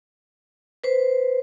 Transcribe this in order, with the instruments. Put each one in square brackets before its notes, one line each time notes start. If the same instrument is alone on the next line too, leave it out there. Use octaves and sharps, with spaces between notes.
[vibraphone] B4 C5